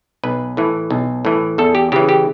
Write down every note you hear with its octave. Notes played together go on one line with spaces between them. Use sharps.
B1 B4
A2 E3
B1
A2 E3
E2 A4
G4
C#3 E3 G4
G4